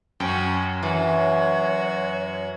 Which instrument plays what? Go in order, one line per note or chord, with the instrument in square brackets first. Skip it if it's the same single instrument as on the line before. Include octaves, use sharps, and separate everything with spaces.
[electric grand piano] F#2 [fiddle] C#4 F#4 [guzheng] G5
[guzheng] E3 [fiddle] F#4 [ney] C#5